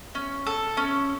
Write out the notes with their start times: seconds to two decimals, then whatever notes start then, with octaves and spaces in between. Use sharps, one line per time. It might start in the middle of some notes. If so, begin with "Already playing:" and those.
0.15 C#4
0.47 A4
0.77 C#4